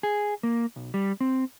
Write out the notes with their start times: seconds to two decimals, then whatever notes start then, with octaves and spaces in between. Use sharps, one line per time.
0.03 G#4
0.43 A#3
0.76 B1
0.94 G3
1.21 C4